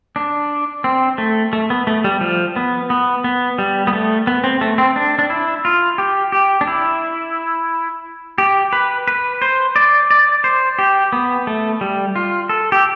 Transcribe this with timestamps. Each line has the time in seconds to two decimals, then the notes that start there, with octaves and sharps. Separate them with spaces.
0.16 D4
0.84 C4
1.18 A3
1.53 A3
1.70 B3
1.87 A3
2.04 G3
2.21 F3
2.56 B3
2.90 B3
3.24 B3
3.58 G3
3.87 B3
3.93 A3
4.27 B3
4.44 C4
4.61 A3
4.78 C4
4.96 D4
5.19 D4
5.30 E4
5.65 F4
5.98 G4
6.32 G4
6.61 D4
6.67 E4
8.38 G4
8.73 B4
9.08 B4
9.42 C5
9.76 D5
10.11 D5
10.44 C5
10.79 G4
11.12 B3
11.47 A3
11.81 G3
12.16 F4
12.49 A4
12.72 G4